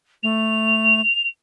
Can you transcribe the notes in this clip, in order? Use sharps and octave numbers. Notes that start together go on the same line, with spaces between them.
A3 F7